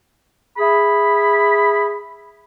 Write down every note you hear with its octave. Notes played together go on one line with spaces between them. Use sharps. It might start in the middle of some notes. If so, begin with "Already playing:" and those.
G#4 E5 B5